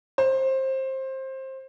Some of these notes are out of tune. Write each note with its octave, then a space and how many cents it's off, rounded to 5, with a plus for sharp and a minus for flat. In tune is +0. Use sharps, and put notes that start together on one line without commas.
C5 +20